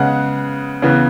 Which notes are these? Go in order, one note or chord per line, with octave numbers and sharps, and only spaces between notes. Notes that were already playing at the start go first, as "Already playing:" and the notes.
Already playing: C#3 G#3 B3 F#5
C#3 E3 B3